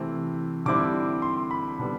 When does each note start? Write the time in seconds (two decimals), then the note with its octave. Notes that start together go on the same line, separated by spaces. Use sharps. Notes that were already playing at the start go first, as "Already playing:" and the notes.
Already playing: C3 E3 A3 C4 E4
0.65 D3 G3 C4 E4 D6
1.22 C6
1.51 B5
1.79 D3 G3 B3